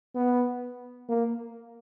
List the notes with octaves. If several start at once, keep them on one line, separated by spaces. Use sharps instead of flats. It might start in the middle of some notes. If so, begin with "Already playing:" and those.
B3
A#3